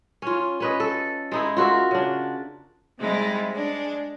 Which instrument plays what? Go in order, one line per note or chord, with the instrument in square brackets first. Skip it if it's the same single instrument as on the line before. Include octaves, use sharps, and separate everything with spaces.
[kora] C#4 F4
C#4 B4 D#5
A4
G#3 D#4 E4
F4 F#4 A#4 E5
C#3 D4
[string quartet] C3 G3 G#3 D#4 E4
G#3 D4